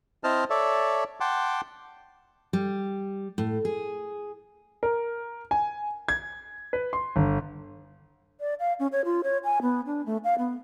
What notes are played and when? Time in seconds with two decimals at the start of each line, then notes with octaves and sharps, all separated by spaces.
0.24 C4 E4 C5 D#5 A5 F6
0.50 A4 C#5 D5 E5
1.20 F#5 G5 A5 C6 D6
2.53 G3
3.38 A2
3.65 G#4
4.83 A#4
5.51 G#5
6.08 G#6
6.73 B4
6.93 C6
7.16 G1
8.40 D5
8.60 F5
8.80 C#4
8.92 C#5
9.05 F4
9.24 C#5
9.44 G#5
9.62 B3
9.86 D4
10.06 A3
10.24 F5
10.39 B3